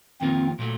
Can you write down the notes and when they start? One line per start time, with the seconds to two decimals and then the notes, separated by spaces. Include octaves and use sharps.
0.21 F2 D#3 A#3 C4 F4 A#4
0.59 A#2 F#3 A3